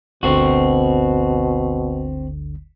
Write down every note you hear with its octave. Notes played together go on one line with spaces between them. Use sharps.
G1 D2 B2 D3 C4 F#4